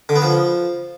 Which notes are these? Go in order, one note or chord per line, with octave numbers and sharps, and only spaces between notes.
D3
B3
F3